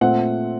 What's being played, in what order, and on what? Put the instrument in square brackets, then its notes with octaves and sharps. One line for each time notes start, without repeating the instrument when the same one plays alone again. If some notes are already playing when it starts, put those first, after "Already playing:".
[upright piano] A#2 A3 C4 F#5